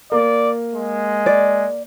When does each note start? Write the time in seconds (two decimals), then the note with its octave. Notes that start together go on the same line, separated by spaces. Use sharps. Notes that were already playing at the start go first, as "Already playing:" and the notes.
0.12 A#3 D5
0.73 G#3
1.26 D5